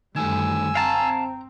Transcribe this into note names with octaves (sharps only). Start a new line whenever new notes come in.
F#2 D3 D#3 G3 A3 G#5 E6
C4 F5 G5 A5 A#5